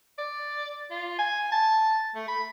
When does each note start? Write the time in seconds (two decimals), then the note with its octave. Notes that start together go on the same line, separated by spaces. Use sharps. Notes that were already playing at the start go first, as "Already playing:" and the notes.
0.18 D5
0.91 F4
1.19 G#5
1.52 A5
2.15 A3
2.28 B5